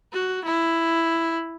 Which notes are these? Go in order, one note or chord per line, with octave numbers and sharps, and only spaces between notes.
F#4
E4